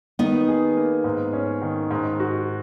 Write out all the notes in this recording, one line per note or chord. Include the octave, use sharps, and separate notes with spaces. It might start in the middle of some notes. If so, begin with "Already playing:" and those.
D#3 B3 D#4
G#4
A#3
G#2
C#4
D#3
G#2
F#4